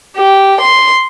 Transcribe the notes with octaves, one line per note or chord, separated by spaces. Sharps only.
G4
C6